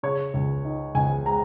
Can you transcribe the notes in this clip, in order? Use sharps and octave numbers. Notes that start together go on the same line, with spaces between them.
C#3 C#5
C#2
D#4
C#2 G#5
G#3 A#5